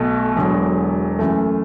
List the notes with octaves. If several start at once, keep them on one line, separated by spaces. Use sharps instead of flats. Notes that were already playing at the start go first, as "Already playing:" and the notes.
Already playing: B1 B2 A3
E1 E2 D3 F#3
F#2 E3 A3